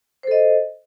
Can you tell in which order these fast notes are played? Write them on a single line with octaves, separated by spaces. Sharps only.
C5 A4 D#5